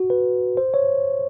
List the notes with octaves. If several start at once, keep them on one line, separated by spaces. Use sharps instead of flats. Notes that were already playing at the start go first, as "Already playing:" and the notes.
Already playing: F#4
B4
C5
C#5